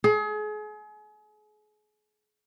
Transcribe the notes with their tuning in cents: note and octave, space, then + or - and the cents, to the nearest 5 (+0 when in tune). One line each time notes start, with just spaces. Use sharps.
G#4 +35